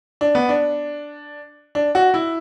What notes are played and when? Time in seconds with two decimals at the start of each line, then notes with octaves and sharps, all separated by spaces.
0.21 D4
0.35 B3
0.49 D4
1.75 D4
1.95 F#4
2.14 E4